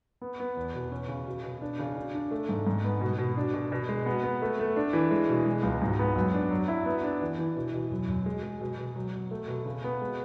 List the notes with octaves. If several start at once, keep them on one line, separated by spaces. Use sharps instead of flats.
B3
B3
E2
B2
C#4
C#3
B2
B2
D4
C#3
D4
D4
A3
G#2
G#2
B3
B2
B2
D4
B2
B2
G#3
B3
B3
A3
A3
D4
E3
G#3
B2
G#3
C#2
G#2
B3
F#2
D4
F#3
E4
B3
D4
E3
E3
B2
B2
F#2
F#2
G#3
G#3
B2
B2
F#3
F#3
A3
B2
C#3
B3
G#3